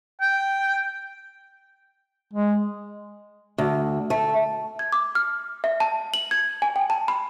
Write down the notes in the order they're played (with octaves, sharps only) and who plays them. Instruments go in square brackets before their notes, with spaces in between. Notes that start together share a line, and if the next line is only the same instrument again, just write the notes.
[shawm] G5
[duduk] G#3
[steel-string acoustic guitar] D2
A3
[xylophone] G#6
D6
F6
E5
A5
F#7
G#6
G#5
G5
A5
B5